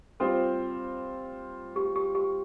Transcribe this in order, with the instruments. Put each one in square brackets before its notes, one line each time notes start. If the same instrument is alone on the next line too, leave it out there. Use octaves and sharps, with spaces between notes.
[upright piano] G3 C4 F4 C5 [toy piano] A4
[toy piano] G4
G4
G4